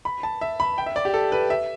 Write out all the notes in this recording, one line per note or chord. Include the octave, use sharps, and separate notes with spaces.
B5
A5
E5
B5
G5
E5
D5
G4
A4
B4
E5